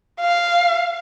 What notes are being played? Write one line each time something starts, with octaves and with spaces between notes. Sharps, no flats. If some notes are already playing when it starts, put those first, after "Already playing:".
F5